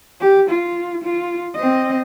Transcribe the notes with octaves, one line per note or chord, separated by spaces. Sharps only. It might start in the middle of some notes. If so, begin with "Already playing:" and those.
G4
F4
F4
C4 D#5